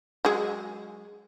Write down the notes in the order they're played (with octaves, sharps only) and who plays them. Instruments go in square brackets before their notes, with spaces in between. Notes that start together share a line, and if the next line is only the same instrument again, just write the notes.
[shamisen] F#3 G#3 G#4